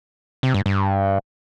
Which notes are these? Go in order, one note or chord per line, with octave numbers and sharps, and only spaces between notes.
C3
G2
G2